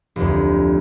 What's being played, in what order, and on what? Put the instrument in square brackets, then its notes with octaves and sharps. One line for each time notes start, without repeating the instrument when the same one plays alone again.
[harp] F1 D2